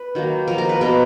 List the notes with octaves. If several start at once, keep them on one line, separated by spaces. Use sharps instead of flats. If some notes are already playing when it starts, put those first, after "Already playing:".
Already playing: B4
D#3 F#3 A#3
F3 A#3 A#4
A#4
B4
B2 A#3 A#4